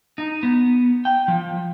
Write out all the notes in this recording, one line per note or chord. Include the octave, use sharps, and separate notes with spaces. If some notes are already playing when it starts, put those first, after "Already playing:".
D#4
B3
G5
F3